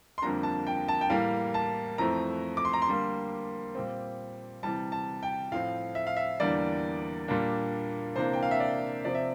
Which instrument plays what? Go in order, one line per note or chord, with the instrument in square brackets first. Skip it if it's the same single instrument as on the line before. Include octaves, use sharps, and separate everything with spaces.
[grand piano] C6
F2 D3 G3 A#3 D4 A#5
A5
G5
A5
G5
A2 E3 G3 A#3 F5
A5
F2 E3 A3 C4 A#5
D6
C6
A#5
C6
D3 G3 A#3
A#2 G3 C4
C3 E3 G3 A5
A5
G5
A2 F3 C4 F5
E5
F5
E5
E2 D3 G3 A#3 D5
A#2 G3 A#3 D4
C3 E3 A#3 D4 C5
G5
F5
E5
D5
C3 F3 C4 D5
E5